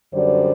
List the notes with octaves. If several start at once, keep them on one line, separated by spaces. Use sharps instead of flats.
F#2 D3 G3 C5 D5